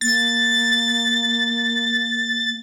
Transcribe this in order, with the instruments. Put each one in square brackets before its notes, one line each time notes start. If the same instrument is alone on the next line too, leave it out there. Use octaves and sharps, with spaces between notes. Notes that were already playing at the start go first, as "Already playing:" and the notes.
[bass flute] A#3 [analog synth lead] A6